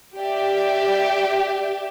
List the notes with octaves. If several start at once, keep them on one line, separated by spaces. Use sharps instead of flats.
G4 D5 E5